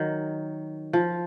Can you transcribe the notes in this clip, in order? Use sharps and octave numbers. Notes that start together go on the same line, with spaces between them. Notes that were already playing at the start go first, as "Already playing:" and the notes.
Already playing: D#3 F#3
F3